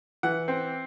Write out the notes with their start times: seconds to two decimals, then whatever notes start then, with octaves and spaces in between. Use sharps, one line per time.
0.23 E3 F#5
0.48 C4